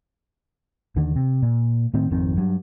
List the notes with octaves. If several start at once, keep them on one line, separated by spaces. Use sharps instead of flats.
D#2 D3 D#3
C3
A#2
A2 D#3 C4
G#1 F2 D#3 C4
G2 F#3